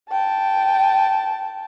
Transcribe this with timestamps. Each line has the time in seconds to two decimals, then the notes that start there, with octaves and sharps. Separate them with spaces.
0.10 G5 A5